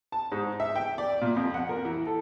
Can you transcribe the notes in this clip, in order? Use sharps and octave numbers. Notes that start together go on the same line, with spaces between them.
A5
G#2
E5
G5
D5
A#2
F2
F#5
A#4
E3
A4